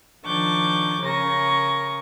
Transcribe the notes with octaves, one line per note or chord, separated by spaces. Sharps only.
D#3 F3 D4 C#6 D6 G6
C#3 A#4 C#6 A#6